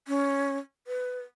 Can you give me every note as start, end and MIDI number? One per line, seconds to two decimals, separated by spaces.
0.08 0.57 61
0.87 1.21 71